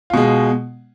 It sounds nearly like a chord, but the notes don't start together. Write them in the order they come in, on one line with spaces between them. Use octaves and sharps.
F4 B2 G#3